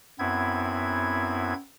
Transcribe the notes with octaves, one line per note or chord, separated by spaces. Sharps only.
F#2 B3 C4 E4 G#6